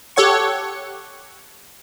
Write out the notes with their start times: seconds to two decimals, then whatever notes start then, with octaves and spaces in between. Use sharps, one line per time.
0.16 G4 A4 C#5 F#5 C#6